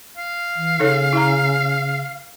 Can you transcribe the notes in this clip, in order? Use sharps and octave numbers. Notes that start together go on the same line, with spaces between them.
F5
E3
C#3 D#4 A4 C#5
E4 A#5